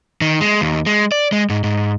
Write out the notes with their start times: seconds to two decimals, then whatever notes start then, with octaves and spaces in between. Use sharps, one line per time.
0.21 D#3
0.41 G#3
0.61 D#2
0.86 G#3
1.12 D5
1.32 G#3
1.50 G#2
1.64 G#2